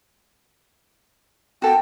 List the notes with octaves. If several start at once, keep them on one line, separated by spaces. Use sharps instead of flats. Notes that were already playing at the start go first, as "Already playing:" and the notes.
F#4 A4 G5